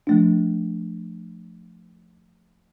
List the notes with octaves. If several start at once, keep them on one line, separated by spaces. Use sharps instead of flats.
F3 A3 D4